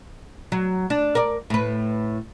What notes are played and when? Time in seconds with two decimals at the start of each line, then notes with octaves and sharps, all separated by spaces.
0.52 F#3
0.90 D4
1.15 A#4 D5
1.50 A2 B4